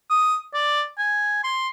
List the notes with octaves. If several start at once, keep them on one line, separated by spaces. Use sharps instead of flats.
D#6
D5
G#5
C6